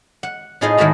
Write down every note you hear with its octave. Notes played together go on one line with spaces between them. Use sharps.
F#5
A2 D#4 F4 G#4 C5 D#5
A2 D#3 G#3 A3 F#4 A#5